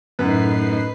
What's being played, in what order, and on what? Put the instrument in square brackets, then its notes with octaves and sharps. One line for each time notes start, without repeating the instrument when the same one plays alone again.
[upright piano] F#2 [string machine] A2 D#4 C7 [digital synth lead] B4